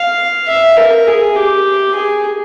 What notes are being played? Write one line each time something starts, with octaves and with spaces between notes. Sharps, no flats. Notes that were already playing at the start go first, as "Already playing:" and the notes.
Already playing: F5
E5
A#4
G#4
G4
G#4